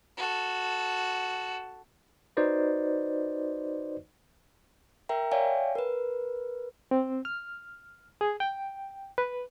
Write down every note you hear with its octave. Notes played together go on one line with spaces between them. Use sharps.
F#4 A4
D#4 F#4 B4 C5 D5 D#5
A#4 E5 G5 A#5
C#5 D5 E5 F5 G5 G#5
A#4 B4
C4
F6
G#4
G5
B4